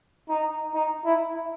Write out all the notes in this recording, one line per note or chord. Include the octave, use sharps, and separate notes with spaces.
D#4
D#4
E4